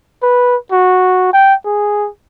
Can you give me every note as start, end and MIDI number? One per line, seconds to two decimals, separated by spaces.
0.23 0.56 71
0.72 1.29 66
1.33 1.55 79
1.66 2.09 68